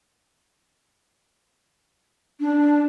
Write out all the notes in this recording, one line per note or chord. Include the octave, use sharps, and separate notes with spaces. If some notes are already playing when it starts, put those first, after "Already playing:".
D4